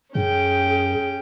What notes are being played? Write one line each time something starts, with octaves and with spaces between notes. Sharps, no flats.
F#2 C#4 G#4 G5